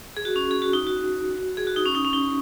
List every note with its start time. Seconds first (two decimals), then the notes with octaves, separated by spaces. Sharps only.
0.17 G#4
0.25 F#4
0.36 C#4
0.51 G#4
0.62 F#4
0.73 D#4
0.87 F#4
1.57 G#4
1.67 F#4
1.76 D#4
1.86 C#4
1.95 D#4
2.05 C#4
2.13 D#4